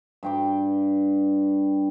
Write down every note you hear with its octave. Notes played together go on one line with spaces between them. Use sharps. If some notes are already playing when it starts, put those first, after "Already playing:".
G2 G5 D6